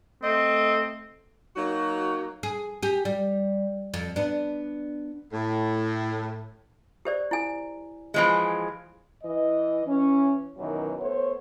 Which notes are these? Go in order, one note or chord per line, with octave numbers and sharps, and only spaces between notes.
A3 C4 D#5
F#3 A#3 D#4 F#4
G#4
G4 G#4
G3
F2
B3 D4
A2
G4 C5 D5
E4 G#5
E3 F3 G#3
E3 D#5
E3 C#4
F#2 B2 D#3 E3 F#3
A3 B3 C5 C#5